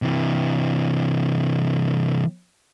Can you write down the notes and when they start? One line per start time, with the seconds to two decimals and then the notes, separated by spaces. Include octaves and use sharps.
0.02 C3 E3